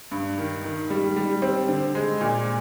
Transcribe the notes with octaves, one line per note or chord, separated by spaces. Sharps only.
G2
D#3
D#3
G3
G3
C4
D3
G#3
A#2